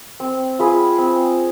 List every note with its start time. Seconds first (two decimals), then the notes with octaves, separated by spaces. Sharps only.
0.20 C4
0.59 F4 G#4 B4
0.98 C4